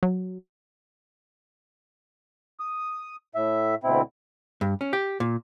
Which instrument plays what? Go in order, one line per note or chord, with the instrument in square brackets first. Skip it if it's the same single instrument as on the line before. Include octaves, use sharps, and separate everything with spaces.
[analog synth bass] F#3
[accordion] D#6
A2 E5
D2 B2 C4 E4
[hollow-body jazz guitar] G2
C#4
G4
A#2